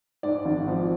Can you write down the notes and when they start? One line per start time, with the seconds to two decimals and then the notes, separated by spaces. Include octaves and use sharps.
0.23 G#2 D5
0.45 G#1
0.68 F3